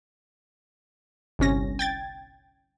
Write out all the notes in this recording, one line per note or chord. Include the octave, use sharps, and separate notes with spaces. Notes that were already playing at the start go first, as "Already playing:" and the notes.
G1 C2 C#4 A#6
G5 G#6 A6